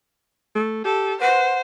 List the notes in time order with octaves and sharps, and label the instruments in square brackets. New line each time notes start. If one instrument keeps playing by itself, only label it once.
[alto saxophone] A3
[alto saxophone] G4 [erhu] A4
[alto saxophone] B4 [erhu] C5 [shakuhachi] F#5